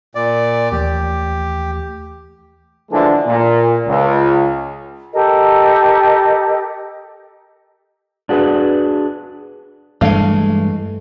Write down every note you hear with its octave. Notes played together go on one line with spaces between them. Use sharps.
A#2 D5
D#2 E3 A3 G4
D3 E3 F3 G#3 A3 D4
A#2
C#2
G4 A4 A#4 D#5
D4 F#4 G#4 B4
G2 E3 G#3 A3 F5